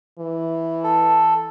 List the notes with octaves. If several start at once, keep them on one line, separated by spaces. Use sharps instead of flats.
E3
A4